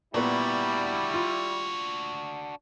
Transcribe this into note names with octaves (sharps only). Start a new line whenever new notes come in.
A#2 G3 B3 D4 E4 F#4
F4